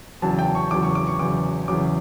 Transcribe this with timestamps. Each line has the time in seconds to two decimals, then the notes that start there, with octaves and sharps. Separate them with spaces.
0.22 E2 C#3 F#3 A5
0.39 G5
0.55 C#6
0.71 E2 C#3 F#3 D6
0.83 C#6
0.95 D6
1.07 C#6
1.19 E2 C#3 F#3 D6
1.68 E2 C#3 F#3 D6